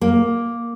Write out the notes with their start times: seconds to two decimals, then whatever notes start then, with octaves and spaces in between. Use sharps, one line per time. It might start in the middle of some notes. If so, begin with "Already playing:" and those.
0.01 A#3